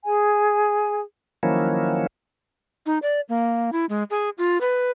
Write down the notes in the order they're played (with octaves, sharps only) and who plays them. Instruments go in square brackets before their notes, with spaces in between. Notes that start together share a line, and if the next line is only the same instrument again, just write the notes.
[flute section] G#4 G#5
[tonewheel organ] D#3 F3 F#3 A#3 C#4 E4
[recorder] D#4
D5
A#3
E4
G#3
G#4
F4
B4